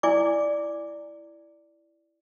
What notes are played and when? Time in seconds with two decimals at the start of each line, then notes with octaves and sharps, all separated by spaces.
0.03 E4 D5 G#5 D6